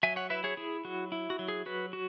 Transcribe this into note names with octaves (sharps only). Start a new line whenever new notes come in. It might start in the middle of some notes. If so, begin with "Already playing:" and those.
F#3 E5 G#5
C#5 F#5
E4 B4 E5
G#4 C#5
E4 G#4
F#3 F#4
E4
F#4
F#3
G#4
F#3 F#4 B4
F#4